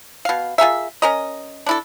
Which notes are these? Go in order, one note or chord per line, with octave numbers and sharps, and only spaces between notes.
B2 F5
F4 G#4 A#4 E5
C#4 A#4 D#5
D4 E4 A4